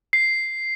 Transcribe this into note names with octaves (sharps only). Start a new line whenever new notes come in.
C7